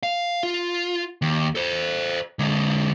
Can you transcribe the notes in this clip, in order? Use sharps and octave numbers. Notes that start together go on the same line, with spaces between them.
F5
F4
D#2
A4 C5
D3 G#3